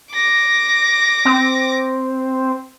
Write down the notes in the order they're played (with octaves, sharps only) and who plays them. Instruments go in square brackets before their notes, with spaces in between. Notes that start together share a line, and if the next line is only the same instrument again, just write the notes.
[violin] D6 A#6
[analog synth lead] C4